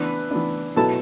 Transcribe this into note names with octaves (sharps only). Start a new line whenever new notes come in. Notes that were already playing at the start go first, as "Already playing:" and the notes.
Already playing: E3 B3 D4 B4
E3 B3 D4
B2 F#3 B3 E4 A4 A5